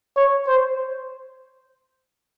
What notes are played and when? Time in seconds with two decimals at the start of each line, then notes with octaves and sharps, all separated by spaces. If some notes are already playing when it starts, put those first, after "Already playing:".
0.16 C#5
0.47 C5